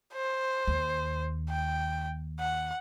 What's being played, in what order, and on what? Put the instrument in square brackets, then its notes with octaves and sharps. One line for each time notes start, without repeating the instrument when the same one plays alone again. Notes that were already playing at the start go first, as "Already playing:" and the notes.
[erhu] C5
[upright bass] D#2
[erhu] G5
F#5